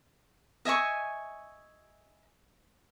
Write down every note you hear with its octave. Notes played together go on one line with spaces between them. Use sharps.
D#5 E5 G#5 C#6